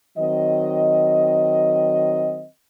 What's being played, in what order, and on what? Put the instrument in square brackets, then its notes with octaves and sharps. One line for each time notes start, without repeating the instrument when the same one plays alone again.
[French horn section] D#3 F#3 C4 D#5